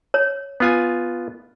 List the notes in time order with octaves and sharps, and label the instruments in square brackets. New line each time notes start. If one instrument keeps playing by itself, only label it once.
[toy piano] C#5
[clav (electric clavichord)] B3 F4 G#5